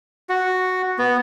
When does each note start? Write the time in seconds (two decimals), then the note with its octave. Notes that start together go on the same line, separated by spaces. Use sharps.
0.29 F#4
0.98 B3